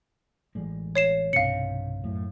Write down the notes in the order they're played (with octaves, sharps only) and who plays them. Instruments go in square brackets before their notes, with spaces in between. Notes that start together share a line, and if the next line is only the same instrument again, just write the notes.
[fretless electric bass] A1 G3 G#3
[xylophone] C#5 C7 E7
[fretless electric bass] B1 G2 C3 [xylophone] F5 C#7
[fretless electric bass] F#2 A2